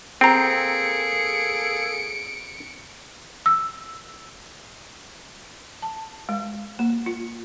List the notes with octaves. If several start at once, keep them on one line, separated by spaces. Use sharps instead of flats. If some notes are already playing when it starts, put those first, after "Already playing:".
A#3 C4 G#4 A4 G5 A#5 C#7 D7
E6
A5
G#3
A#3
F4